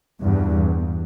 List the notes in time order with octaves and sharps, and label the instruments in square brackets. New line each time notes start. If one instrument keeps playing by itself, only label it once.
[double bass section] E2 G2